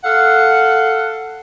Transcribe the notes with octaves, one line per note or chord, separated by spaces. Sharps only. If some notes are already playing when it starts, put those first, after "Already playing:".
A4 F5 F#5